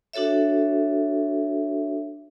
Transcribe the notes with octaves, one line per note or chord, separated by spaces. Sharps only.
D4 F#4 A4 C#5 E5